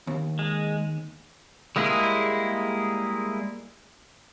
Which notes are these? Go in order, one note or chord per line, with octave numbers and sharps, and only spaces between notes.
D#2
G#3
G3 G#3 A#3 E4 G#4